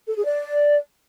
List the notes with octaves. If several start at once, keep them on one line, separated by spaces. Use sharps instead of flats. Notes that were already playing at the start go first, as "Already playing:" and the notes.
A4
G#4
D5